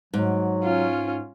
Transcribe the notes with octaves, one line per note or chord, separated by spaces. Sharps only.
G#2 F#3
C#4 F4